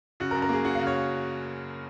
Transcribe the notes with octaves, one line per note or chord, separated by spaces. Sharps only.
C#3 F#4
A#4
F#2
A#4
A#3 G#4
F#3 F#4
C#3 F5
C#5